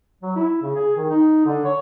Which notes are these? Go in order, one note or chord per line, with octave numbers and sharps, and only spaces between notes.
F#3
E4
C#3
G#4
D#3
D#4
D3
C#5